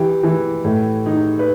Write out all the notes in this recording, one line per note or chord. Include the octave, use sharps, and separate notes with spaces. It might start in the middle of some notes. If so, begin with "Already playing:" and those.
Already playing: E3 G4
E3
A2
D#4
B4